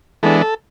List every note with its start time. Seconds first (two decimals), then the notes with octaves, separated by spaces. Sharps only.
0.23 E3 G#3 B3 D4 A4
0.41 A4